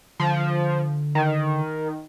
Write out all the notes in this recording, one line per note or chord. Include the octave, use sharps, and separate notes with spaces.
D3 F3
D#3